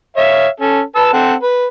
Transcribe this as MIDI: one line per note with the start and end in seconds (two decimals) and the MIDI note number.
0.17 0.48 73
0.17 0.48 76
0.17 0.48 77
0.60 0.81 61
0.60 0.81 69
0.96 1.12 71
0.96 1.12 81
0.96 1.12 88
1.13 1.34 60
1.13 1.34 69
1.13 1.34 78
1.43 1.67 71